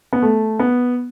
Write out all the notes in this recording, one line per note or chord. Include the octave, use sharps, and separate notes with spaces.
B3
A3
B3